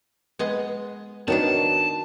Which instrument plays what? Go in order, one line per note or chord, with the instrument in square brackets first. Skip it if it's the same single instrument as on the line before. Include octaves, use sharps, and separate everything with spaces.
[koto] G#3 B3 D#5
[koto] D#3 B3 D4 [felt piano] D#4 F#4 C#5 [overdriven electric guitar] A5